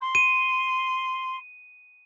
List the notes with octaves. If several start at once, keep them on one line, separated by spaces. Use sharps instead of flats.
C6
D#7